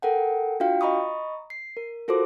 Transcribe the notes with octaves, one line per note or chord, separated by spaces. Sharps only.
A4 A#4 F#5 G5
D4 F4 F#4 F5 G5
D#5 A#5 B5 C#6 D#6
C7
A#4
F4 F#4 A4 A#4 C5 D6